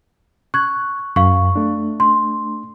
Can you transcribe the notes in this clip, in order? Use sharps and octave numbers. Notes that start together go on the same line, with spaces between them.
C#6 F#6 G#6
F#2 F5 C#6
A3 D4
C6